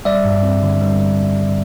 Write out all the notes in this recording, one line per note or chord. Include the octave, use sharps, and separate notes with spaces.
G3 D5 E5
G2
C4
D3
G3